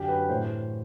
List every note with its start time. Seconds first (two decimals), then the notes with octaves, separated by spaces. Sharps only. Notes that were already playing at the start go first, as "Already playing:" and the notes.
Already playing: F#2 D3 F#3 G4
0.08 B4
0.29 A2 E3 C5